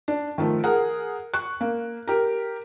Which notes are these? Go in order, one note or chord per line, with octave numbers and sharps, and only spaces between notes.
D4
D#3 F3 A3
G#4 A#4 F#5
C#6 F#6
A#3
G4 A#4